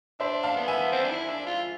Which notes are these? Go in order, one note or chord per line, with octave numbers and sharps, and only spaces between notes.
D4 C5 E5
F5 A5
B3
E5 G#5
C4
D4
E4
D4
F4